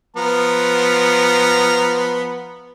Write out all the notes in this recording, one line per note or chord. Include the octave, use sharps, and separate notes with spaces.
F3 B3 A#5